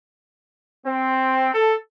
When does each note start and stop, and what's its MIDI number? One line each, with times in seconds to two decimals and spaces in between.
0.86 1.50 60
1.54 1.76 69